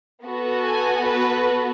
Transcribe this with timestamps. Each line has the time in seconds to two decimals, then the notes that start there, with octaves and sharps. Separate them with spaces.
0.24 B3 F#4 A4
0.64 G#5
1.04 B4